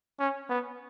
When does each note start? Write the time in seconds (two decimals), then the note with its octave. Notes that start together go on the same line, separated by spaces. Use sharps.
0.19 C#4
0.49 B3